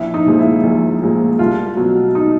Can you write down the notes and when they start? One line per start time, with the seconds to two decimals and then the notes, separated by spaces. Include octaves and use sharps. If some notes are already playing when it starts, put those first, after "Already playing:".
Already playing: A#1 E4
0.14 D#4
0.26 A#2 F3 G#3
0.39 E4
0.63 A#1
1.02 A#2 F3 G#3
1.39 C2 F4
1.77 B2 F#3
2.15 D#4